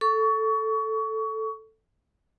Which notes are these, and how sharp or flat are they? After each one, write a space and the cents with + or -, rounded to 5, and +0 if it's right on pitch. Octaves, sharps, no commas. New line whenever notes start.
A4 +0 C#6 +30